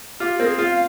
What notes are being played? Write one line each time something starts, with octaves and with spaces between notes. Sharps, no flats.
F4 G4
C4 A#4
G#4
F4
F5